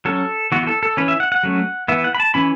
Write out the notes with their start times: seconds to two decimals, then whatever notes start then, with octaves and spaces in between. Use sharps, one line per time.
0.05 F#3 C#4 A4
0.52 E3 B3 F#4
0.63 F#4
0.67 A4
0.83 A4
0.97 E3 C#4 B4
1.08 E5
1.20 F#5
1.32 F#5
1.43 F#3 A3 C#4
1.88 E3 B3 E5
2.04 F#5
2.15 B5
2.20 A5
2.34 E3 C#4 B5